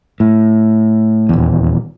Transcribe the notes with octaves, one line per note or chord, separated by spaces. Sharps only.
A2
D#1 E2